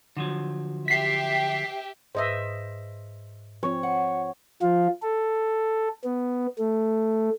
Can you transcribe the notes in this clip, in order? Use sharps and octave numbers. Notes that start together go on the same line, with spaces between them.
D3 F3 F#3
G4 E5 B6 C7
G#2 B4 C5 D#5 E5
F3 C4 C#5
F#5
F3 F4
A4
B3
A3